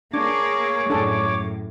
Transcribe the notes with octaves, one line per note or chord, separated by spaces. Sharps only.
A#3 D4 G#4 C#5 D6
F#2 A2 D4 G#4 A4